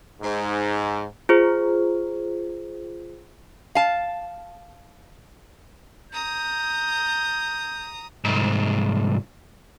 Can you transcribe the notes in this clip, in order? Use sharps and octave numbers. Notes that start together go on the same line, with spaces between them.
G#2
F4 G#4 C5
F5 A5
A#5 D#6 G6
C2 G#2